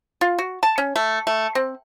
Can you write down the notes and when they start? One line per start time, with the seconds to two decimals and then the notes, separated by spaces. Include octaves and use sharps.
0.21 F4
0.39 F#4
0.63 A5
0.78 C#4
0.96 A3
1.27 A3
1.55 C4